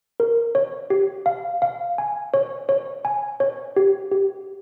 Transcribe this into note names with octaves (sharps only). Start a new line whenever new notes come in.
A#4
C#5
G4
F5
F5
G#5
C#5
C#5
G#5
C#5
G4
G4